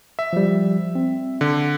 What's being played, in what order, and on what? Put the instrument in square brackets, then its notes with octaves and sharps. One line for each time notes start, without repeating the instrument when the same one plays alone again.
[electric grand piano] E5
[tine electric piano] F3 G3
C4
[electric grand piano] D3